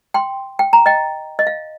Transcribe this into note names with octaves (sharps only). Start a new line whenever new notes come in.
G5 C6
G5
A#5
D#5 G5
D#5
F5